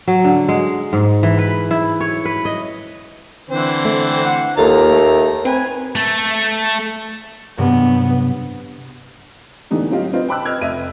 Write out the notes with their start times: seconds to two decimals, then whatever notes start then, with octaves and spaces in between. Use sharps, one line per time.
0.07 F#3
0.24 D3
0.48 G#3
0.93 G#2
1.23 E3
1.38 B4
1.71 E4
2.00 C#5
2.25 B4
2.45 D#5
3.50 D3 E3 C4 C5
3.85 A3
4.25 F#5
4.57 D#2 A#3 F4 A4 A#5 A6
4.91 A3
5.45 C4 B4 G#5
5.95 A3
7.58 G2 C3 F#3 B3
9.71 A2 D3 E3 B3 D#4 G4
9.91 F#3 C4 F4 G4 D#5 F5
10.13 C4 F4 B4 C5 D#5
10.29 G5 A5 B5 D6 E6 F#6
10.45 B4 D#5 E6 F6 G#6
10.61 F1 D#5 E5 D#7